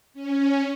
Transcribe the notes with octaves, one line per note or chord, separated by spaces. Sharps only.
C#4